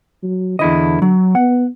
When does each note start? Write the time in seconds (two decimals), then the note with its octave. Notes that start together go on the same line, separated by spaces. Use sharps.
0.23 F#3
0.59 E2 D3 E4 D#5
1.02 F#3
1.35 B3 F#5